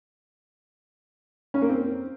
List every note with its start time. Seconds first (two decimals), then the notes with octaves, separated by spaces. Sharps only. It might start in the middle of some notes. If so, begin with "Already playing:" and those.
1.54 C#4
1.62 A#3
1.69 C4